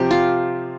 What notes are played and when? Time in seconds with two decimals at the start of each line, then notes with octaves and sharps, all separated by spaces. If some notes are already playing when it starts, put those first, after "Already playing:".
Already playing: C3 F3 C4 G4
0.11 F4